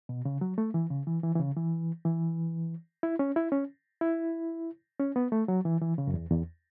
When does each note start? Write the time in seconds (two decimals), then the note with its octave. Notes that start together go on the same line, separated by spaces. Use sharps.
0.09 B2
0.25 C#3
0.41 F#3
0.58 A3
0.74 E3
0.90 C#3
1.07 E3
1.23 E3
1.35 E3
1.39 C#3
1.57 E3
2.05 E3
3.03 E4
3.19 C#4
3.36 E4
3.52 C#4
4.01 E4
5.00 C#4
5.16 B3
5.32 A3
5.48 F#3
5.65 E3
5.82 E3
5.98 C#3
6.07 F#2
6.14 E2
6.30 E2